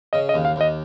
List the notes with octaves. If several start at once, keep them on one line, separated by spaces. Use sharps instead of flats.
C#3 D#5
D#5
D#2
F5
D#2 D#5